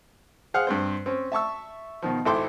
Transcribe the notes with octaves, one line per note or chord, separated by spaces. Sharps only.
G#4 C5 F5 F#5 D#6 F6
G2 C4 C5
C4 C#4
E5 A5 C#6 E6
B2 D#3 F3
G#1 E4 A4 G5 C6 D6